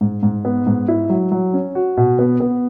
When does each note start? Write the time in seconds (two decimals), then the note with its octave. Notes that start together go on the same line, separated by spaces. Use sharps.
0.01 G#2
0.23 G#2
0.45 B3
0.67 G#2
0.88 E4
1.10 F#3
1.32 F#3
1.54 C#4
1.75 F#4
1.97 B2
2.19 B3
2.40 B3